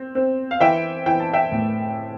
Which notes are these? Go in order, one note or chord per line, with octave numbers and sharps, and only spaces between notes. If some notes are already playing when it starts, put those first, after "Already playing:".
Already playing: C4
C4
F5
E3 E5 G5
E3 G5
A5
E5 G5
A2